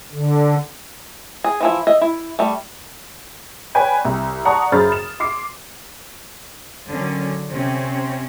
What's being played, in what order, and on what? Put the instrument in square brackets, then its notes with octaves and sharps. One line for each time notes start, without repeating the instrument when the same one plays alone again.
[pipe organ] D3
[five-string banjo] G#4
E3 F3 E4
D#5 E5
E4
G3 A3
[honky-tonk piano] B4 C#5 D5 G5 G#5 B5
C2
D5 F#5 A5 A#5 C#6 D#6
F#2 C#3 C5 B5 F6 A6
E7
C6 D6 C7
[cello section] D3 D#3 F#3 C#4
C3 C4 C#4